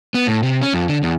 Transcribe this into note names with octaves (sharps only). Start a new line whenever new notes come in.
B3
A2
C3
C#4
F2
D3
E2